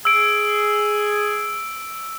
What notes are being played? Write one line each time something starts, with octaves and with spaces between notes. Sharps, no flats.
G#4 E6 D7